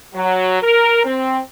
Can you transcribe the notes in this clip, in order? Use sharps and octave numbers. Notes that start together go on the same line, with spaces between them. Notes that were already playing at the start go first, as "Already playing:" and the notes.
F#3
A#4
C4